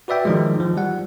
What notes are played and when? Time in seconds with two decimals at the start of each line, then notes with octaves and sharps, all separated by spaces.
0.08 F#4 B4 D5 E5 G5
0.25 D#3 F3 G#3
0.60 E3 F3
0.77 G3 F#5